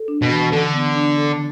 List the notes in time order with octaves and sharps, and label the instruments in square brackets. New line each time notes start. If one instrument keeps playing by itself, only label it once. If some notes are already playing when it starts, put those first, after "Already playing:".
Already playing: [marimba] A4
D4
[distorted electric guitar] B2
[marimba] E3
[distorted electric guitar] D3 [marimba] A4
[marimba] B3
D4
A4